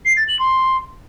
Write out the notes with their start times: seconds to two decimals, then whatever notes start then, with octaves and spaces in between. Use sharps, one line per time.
0.05 C7
0.17 A6
0.28 F#7
0.39 C6